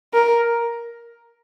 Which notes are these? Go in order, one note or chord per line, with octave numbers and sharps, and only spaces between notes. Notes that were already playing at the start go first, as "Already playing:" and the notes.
A#4